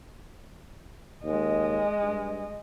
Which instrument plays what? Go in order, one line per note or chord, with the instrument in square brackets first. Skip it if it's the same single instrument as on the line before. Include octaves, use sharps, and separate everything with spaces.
[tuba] D#2 [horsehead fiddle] G#3 D#5
[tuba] G2